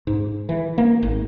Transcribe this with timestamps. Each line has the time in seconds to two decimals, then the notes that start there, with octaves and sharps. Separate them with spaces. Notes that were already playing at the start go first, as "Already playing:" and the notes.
0.07 G#2
0.49 E3
0.78 A#3
1.03 G#1